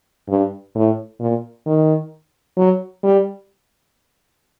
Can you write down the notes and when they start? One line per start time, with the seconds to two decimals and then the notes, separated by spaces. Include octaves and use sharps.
0.28 G2
0.75 A2
1.20 A#2
1.66 D#3
2.57 F#3
3.04 G3